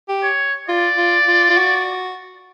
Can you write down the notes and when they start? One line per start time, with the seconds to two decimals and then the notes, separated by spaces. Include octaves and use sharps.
0.09 G4
0.23 C#5
0.68 F4 D5
0.98 F4
1.27 F4
1.50 F4
1.58 F#4